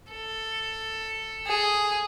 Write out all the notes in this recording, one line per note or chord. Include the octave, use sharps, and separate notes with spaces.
A4
G#4